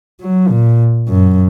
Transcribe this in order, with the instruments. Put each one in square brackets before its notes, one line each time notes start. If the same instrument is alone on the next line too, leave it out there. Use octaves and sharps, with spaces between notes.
[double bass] F#3
A#2
F#2